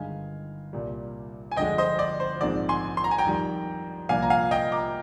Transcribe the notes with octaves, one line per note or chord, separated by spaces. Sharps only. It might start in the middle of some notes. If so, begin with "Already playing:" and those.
Already playing: G1 G2 D#3 G#3 D#4 F5 G#5
C2 A#2 G3
G#5
G1 F2 D3 G#3 D#5 G5
C5 D#5
D5
C5
A#1 G#2 D#3 G#3 C4 D5
G#5 C6
C6
A#5
G#5
G5 A#5
F2 D#3 G3
C2 A#2 F3 A#3 D4 F5 G#5
A#5
F5 G#5
D#5 G5
A#5 D6